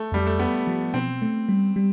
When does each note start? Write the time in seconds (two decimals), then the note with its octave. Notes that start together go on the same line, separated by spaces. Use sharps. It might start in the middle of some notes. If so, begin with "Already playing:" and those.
Already playing: A3
0.12 F2 G3
0.27 A3
0.39 B3 G4
0.67 F3
0.94 B2 C4
1.22 A3
1.49 G3
1.76 G3